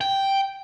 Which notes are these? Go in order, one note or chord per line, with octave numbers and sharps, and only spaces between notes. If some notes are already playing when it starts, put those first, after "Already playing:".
G5